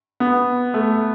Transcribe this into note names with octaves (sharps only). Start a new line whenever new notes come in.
B3
A3